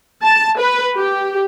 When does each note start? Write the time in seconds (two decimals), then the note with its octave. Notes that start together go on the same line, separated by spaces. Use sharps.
0.22 A5
0.59 B4
0.96 G4